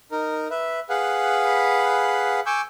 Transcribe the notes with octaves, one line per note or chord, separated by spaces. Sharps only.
D#4 A#4
B4 E5
G#4 B4 F5 F#5 B5
G#5 C#6 D6 E6 G6